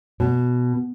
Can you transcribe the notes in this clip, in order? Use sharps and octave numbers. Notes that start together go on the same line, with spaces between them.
B2